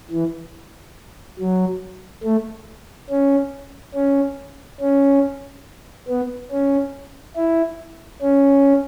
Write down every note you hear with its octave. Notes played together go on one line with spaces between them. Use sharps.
E3
F#3
A3
C#4
C#4
C#4
B3
C#4
E4
C#4